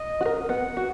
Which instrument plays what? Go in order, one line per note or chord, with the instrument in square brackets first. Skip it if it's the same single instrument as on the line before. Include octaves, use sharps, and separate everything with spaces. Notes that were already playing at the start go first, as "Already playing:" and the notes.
Already playing: [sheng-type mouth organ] D#5
[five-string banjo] F#4
A#4
[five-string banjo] B3 [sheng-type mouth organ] F#5
[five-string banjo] F#4